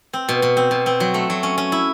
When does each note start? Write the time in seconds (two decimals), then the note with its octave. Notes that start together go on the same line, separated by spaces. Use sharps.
0.13 C4
0.29 B2
0.42 B2
0.57 C4
0.71 B2
0.86 C4
1.00 F#3
1.14 A3
1.30 F#3
1.43 C#4
1.58 C#4
1.72 E4